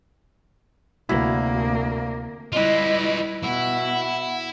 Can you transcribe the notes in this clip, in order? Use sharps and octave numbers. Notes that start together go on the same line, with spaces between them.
D2 C3 A#3 E4 F#4
G3 E4 F4 B4 D#5
B2 E4 F#5